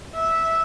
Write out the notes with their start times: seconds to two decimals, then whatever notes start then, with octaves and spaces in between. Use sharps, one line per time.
0.15 E5